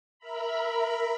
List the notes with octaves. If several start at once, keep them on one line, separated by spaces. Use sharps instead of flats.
A#4 E5 A#5 B5